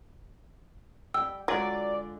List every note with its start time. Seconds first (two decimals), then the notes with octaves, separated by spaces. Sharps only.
1.14 G3 G5 E6
1.48 D3 F#3 G#3 F4 D5